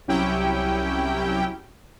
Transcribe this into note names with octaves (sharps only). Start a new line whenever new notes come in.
C2 F#3 C#4 E4 G4 G5